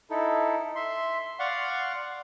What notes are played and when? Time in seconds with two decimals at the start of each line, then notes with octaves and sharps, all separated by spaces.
0.10 D#4 E4 A4
0.76 E5 C6
1.39 D5 F5 F#5 C6 C#6